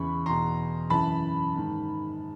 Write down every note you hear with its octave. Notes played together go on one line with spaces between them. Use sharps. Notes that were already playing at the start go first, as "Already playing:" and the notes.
Already playing: E2 C#3 E3 B5 C#6
E2 B2 A#5 C6
F#2 C#3 E3 A5 B5
G#2 D#3